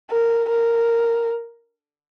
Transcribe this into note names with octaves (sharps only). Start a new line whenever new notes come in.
A#4
A#4